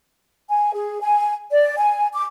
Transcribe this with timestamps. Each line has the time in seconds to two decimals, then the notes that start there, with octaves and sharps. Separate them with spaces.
0.50 G#5
0.73 G#4
1.00 G#5
1.51 D5
1.77 G#5
2.13 D6